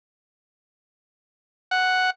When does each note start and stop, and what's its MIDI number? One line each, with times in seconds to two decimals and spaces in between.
1.71 2.10 78